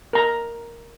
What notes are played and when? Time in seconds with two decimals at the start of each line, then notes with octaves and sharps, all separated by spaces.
0.13 A#4 A#5